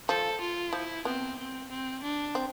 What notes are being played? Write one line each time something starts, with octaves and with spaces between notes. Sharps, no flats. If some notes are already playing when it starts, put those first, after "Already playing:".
F3 A4
F4
F3 E4
B3 C4
C4
C4
D4
C4